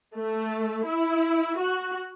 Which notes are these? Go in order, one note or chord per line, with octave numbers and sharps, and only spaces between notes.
A3
E4
F#4